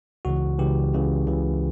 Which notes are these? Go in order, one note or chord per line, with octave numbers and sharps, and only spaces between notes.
C#2 C#3 E3 F#4
C#2 C#3 E3 G4
C#2 C#3 E3
C#2 C#3 E3